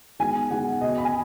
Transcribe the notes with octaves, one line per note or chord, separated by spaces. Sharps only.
D#3 G#3 B3 G#5
D#3 G#3 B3 F#5
B2 B3 D#5
B5
G#5